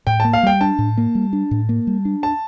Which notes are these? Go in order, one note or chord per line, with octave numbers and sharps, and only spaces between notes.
A2 G5
A#3 A5
F5
G3 G5
D4 A5
A2
A#3
G3
D4
A2
A#3
G3
D4
A5